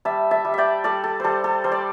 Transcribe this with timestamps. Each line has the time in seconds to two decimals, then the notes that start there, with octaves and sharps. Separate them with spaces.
0.05 G3 E5 A5
0.31 E5 A5
0.45 G3
0.54 D5 E5 G5
0.84 G3 A4 D5
1.04 A4
1.20 G3 A4 C5
1.44 A4
1.64 G3 C5
1.72 D5